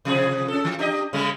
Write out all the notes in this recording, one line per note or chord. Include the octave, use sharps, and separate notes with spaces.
C3 F3 G#4
C#4 A4
E3
D4 G4 D#5
C#3 G3 G#3